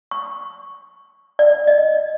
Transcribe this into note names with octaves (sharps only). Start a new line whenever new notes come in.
C#6
D5
D#5